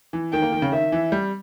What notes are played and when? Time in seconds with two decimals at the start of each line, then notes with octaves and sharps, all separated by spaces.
0.13 E3
0.33 D#3 G5
0.42 A#3
0.52 D#3
0.62 C#3
0.72 D#3 E5
0.92 E3
1.12 G3